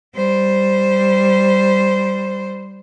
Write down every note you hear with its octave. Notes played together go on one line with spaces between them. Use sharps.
G3 C5